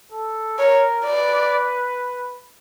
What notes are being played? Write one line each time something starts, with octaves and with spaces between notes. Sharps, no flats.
A4
A#4 C#5
B4 D5